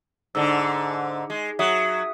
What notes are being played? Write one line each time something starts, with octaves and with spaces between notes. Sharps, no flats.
G#2 D3 D4 E6
G#3
F#3 E5 D#6